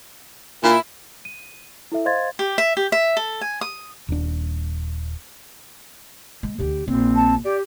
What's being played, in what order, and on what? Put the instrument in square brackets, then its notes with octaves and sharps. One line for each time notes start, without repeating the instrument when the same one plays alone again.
[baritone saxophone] A#2 [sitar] E4
[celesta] D#7
E4 A4 E5
C5 D#5 F5 C6 G#6 A6
[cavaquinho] G4
E5
G4
E5
A4
G#5
D#6
[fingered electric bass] D#1 D4
[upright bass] G#3
[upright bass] D2 D3 [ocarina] G4
[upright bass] A#1 [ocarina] C4
[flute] A5
[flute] G4 [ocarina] D5